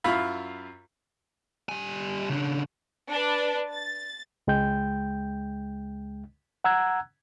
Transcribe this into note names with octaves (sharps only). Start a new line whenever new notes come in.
F#2 E4 F4 F5 B5
G3 G#5
C#3 D4
D4 B4
A6
C#2 G#3 G5 G6
F#5 A#5 E6 F#6 G#6